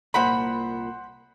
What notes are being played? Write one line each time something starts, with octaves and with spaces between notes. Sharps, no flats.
C2 A#2 C5 F#5 B5 C6